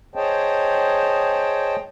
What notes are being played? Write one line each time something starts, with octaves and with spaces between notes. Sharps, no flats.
G#4 C5 C#5 D#5 G5 A5